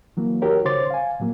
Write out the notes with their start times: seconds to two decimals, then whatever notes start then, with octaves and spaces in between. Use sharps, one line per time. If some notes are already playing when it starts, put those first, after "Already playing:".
0.17 E3 F#3 A#3
0.42 D#4 F#4 G4 A#4 C#5
0.65 C#3 C5 C#5 C6 D6 A6
0.90 F5 G#5
1.20 A2 F#3 A#3